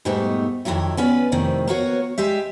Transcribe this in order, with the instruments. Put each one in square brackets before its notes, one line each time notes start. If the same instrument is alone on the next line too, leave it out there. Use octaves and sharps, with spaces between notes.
[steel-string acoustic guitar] G#2 B2 G3 A3 B3 D#4
F2 B2 D#3 F#3 E4
B3 C#4 B4 D5
F2 A2 C3 D#3
A#3 B3 F#4 C#5
G3 G#3 G4 E5